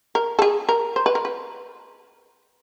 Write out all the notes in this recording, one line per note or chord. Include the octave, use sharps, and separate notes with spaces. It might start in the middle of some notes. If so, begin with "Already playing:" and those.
A#4
A4
G#4
A#4
C5
B4
A#4
B4